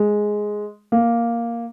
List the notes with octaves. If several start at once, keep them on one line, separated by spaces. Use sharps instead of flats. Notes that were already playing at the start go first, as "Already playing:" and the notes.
Already playing: G#3
A#3